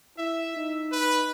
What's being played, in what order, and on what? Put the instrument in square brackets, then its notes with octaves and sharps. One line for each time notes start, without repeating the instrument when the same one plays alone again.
[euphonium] E4 [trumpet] E5
[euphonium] D#4
[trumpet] B4